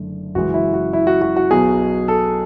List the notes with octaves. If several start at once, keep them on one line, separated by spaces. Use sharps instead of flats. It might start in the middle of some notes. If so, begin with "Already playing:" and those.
Already playing: F#1 F#2 D3 A3
F#1 F#2 C#3 E3 G#3 F#4
E4
F#4
E4
F#4
F#4
F#4
B1 B2 F#3 G#4
A4